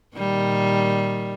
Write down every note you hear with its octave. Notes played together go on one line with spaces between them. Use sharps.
A#2 D#3 G3